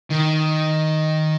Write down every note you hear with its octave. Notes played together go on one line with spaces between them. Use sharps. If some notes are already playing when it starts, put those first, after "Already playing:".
D#3